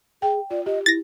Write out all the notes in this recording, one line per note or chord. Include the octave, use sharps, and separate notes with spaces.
G#4 G5
F4 D5
G4 D#5
E4 A6 A#6